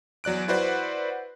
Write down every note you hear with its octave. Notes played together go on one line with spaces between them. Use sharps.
E2 F#3 D5 F#6 D7
E4 F#4 B4 C5 D5 F#5